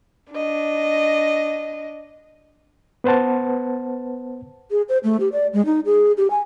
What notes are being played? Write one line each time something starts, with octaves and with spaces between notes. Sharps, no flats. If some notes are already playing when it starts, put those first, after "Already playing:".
D4 D#5
B3 B4 C5 F#5 A5
G#4
C5
A3
G4
D5
G#3
D#4
G#4
G4
G#5